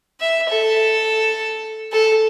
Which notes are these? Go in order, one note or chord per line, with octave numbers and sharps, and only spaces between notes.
E5
A4
A4